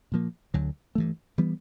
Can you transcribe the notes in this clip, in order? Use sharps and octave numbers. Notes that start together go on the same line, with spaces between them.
A#2 F3 A#3
D2 D3 F#3
G2 E3 A3
E3 G3 B3